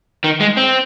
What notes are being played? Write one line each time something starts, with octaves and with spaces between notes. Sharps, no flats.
D#3
G#3
C4